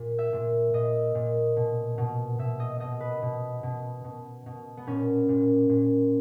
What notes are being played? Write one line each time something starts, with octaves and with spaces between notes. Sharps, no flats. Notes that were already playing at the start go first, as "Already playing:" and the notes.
Already playing: A#2
E5
A#2
A#2 D#5
A#2
B2
B2
B2 E5
D#5
B2 D#5
B4
B2
B2
B2
B2
B3
A#2 C#4
A#2
A#2